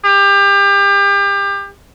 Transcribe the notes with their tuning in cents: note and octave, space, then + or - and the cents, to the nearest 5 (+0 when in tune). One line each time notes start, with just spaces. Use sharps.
G4 +30